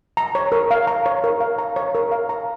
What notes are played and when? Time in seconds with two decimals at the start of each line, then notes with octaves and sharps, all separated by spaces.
0.17 A#5
0.35 C#5
0.52 A#4
0.71 F5
0.87 A#5
1.06 C#5
1.24 A#4
1.40 F5
1.58 A#5
1.76 C#5
1.95 A#4
2.12 F5
2.29 A#5